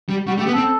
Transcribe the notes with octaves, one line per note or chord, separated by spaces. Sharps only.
G3
G3 F#4
A3
G4
B3
C4 A4